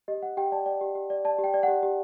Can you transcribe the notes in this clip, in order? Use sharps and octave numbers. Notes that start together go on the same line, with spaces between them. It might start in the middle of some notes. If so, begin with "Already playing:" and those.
G4 D#5
G4 F#5
G4 G5
D5 A5
D5 G5
G4
G4
D5
D5 A5
G4
G5
D5
G4 F#5
G4